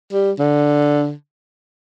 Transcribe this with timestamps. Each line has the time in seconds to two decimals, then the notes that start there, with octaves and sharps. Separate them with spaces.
0.13 G3
0.39 D3